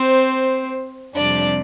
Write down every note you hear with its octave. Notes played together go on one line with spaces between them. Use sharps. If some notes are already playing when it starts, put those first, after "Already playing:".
Already playing: C4 C5
F2 C3 G3 D4 D5